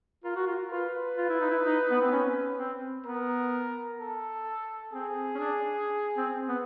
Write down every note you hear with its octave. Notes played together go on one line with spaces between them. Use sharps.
F4 A#4
F#4
F4
F4 B4
F4
E4
D#4
E4
D#4
B3
C4
C#4
C4
B3 A#4
A4
C4 G#4
C#4
D4
C4
B3